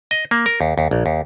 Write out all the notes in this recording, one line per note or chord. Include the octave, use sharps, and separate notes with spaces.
D#5
A#3
A#4
D#2
D#2
A#1
D#2